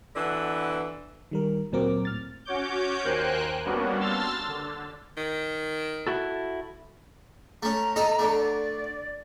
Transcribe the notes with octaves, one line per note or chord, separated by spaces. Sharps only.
B2 D3 E3 D4 F#5
D#3 G3 A#4
D2 A#2 F#3 C4 A#4 D6
A2 F6 A6
C#4 F#4 C#5 D6 G6
D#2 A#4 C5 G5 G#5 F#6
G3 A#3 B3 C#4 D4 F#4
A5 C6 E6 F6 A6
D3
D#3
E4 F#4 A4
A3 C#4 A#5
D#4 A4 D#5
D3 A3
D5